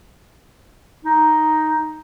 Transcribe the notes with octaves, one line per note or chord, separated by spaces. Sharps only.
D#4